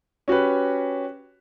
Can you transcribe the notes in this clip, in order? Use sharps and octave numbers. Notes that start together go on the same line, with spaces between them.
C#4 F#4 G4 B4